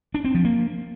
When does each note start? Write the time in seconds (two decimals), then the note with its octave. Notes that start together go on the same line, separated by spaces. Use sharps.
0.14 D4
0.25 C4
0.35 F3
0.45 A#3